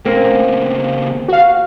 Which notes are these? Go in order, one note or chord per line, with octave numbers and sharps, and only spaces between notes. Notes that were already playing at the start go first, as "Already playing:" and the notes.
A#2 C#3 A#3 C4
F#4 F5